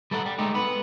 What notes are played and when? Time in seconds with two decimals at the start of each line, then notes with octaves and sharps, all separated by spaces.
0.11 G3 A4 A#4 D#5 F#5
0.26 G3
0.39 G#3 A3 D#4 G4
0.54 B3 B4